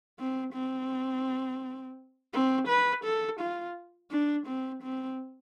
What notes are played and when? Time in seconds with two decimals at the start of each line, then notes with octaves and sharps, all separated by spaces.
0.19 C4
0.54 C4
2.34 C4
2.68 B4
3.05 A4
3.40 F4
4.11 D4
4.47 C4
4.83 C4